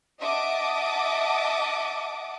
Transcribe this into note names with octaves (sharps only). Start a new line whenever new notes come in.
D#5 E5 F#5 A5 D6 D#6